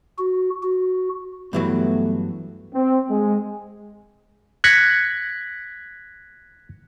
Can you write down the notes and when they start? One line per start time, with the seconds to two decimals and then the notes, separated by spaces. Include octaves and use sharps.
0.19 F#4
0.63 F#4
1.53 G2 E3 F#3 A3 B3
2.74 C4
3.10 G#3
4.64 F#6 G#6 A#6 B6 C#7